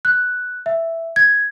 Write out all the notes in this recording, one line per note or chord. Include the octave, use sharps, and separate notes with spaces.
F#6
E5
G#6